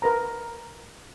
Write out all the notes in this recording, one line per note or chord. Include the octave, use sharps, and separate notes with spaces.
A#4 B4 A#5